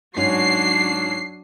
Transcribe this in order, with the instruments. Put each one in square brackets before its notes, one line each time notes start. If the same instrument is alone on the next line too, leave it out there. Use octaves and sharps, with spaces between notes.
[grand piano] G#2 C#4 [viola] F#3 D4 [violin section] C7